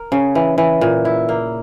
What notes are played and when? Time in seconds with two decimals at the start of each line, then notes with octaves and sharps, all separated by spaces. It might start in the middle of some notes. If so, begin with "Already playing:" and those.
Already playing: A#4
0.12 C#3
0.35 E3
0.58 E3
0.81 A#2
1.05 E4
1.29 A#3